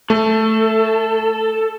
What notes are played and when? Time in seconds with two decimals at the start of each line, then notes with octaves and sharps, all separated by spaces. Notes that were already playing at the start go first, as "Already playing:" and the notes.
0.10 A3 A4